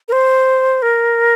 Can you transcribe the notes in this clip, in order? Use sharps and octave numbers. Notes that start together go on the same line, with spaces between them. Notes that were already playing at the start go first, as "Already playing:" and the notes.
A#4
C5
A#4